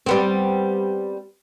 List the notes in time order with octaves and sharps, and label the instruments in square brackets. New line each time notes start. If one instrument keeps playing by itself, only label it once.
[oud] G3 B3 C4